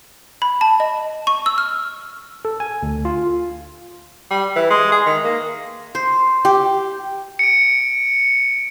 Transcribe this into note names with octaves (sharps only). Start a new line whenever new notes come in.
B5
A5
D#5
C#6
E6
F6
A4
G#5
D2
F4
G3
E3
G#3
G#4
D#3
A#3
C5
G4
C#7 D7